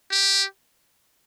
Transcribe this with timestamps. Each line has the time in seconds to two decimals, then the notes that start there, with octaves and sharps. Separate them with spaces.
0.12 G4